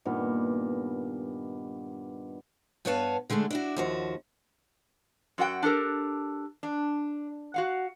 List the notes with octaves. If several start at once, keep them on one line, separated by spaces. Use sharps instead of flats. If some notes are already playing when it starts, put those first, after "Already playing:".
G2 A#2 D#3 B3
G2 B3 B4 C#5 F5 A5
D3 G#3 A3 C#4 D4
D4 E4 F#4
D#2 F3 F#4
F#2 F#4 F#5 G5
D4 G4 A4 A#4
D4
F#4 F5 F#5